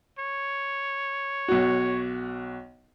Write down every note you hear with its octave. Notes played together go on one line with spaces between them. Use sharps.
C#5
B1 F#4